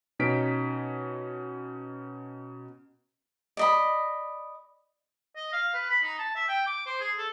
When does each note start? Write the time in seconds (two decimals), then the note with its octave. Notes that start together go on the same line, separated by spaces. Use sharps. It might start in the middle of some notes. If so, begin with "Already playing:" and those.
0.19 B2 C#4 D#4 B6 D7
3.57 D5 D#5 B5
5.36 D#5
5.53 F5
5.74 B4
5.89 B5
6.03 D#4
6.19 A5
6.36 E5
6.48 G5
6.66 D6
6.86 C5
7.00 G#4
7.17 A4